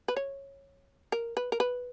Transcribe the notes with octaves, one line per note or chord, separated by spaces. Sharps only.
B4
C#5
A#4
B4
A#4
B4